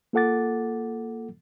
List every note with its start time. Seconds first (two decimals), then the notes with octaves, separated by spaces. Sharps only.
0.13 A#3 F4 A4 F#5 D6 A6